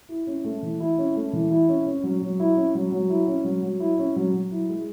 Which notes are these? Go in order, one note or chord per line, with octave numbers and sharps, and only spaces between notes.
E4
C#4
A3
E3
E4
C#4
A3
E3
E4
C#4
C#4
F#3
F#3
E4
C#4
F#3
F#3
E4
C#4
F#3
F#3
E4
C#4
F#3
F#3
E4
G#3